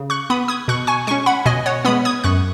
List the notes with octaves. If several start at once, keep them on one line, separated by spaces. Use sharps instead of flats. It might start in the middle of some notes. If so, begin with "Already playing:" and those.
Already playing: C#3
C#6 F#6
B3 B5 D#6
D#6 G#6
B2 C#6 F#6
G#5 C#6
G#3 C#4 G#5 C#6
F#5 B5
B2 D#5 G#5
C#5 F#5
G#3 B3 B5 D#6
D#6 G#6
F#2 C#6 F#6